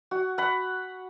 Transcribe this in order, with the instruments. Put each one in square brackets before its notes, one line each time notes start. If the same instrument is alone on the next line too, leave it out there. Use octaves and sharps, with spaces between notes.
[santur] F#4
F#5 B5